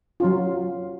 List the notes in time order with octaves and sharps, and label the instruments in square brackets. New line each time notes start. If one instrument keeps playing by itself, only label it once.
[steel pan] F#3 C#4 F4